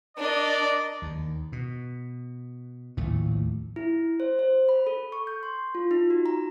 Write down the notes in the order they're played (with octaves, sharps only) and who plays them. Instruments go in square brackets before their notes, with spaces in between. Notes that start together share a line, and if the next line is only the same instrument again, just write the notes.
[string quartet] D4 [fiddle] A#4 D#5 [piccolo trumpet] D5
[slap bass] D#2
B2
A#1 D#2 A2 A3
[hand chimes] E4
C5
C5
B5
A4
C#6
G6
C6
F4
D#4
F#4
A#5